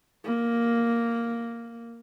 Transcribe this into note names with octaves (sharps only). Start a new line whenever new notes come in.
A#3